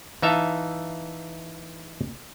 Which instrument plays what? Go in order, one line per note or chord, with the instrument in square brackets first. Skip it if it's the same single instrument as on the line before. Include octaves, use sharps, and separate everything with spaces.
[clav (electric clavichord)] E3 D#4 E5 F5 A5